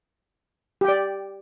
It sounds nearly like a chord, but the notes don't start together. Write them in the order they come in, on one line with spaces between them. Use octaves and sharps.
G4 G5 D5